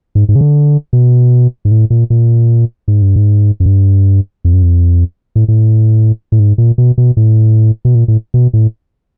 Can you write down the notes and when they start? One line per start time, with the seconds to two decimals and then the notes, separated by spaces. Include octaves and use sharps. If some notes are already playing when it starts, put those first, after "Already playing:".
0.15 G#2
0.29 G#2
0.35 C#3
0.41 D3
0.93 B2
1.65 G#2
1.71 A2
1.90 A#2
2.10 A#2
2.88 G#2
3.02 G2
3.16 G#2
3.60 F#2
3.66 G2
4.45 F2
4.53 F#2
4.63 F2
5.36 A2
5.48 A2
6.32 A2
6.39 G#2
6.58 A#2
6.78 B2
6.98 B2
7.17 A2
7.85 B2
7.95 A#2
8.08 A2
8.34 B2
8.53 A2